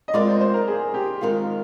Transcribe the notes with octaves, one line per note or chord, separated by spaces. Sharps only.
D#5
G#3 C4 F4 A#4 D5
C5
C5
A#4
G#4
G4
D#3 G#3 C4 D#4 F4 A#4